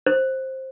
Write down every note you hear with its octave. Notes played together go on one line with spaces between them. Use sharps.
C5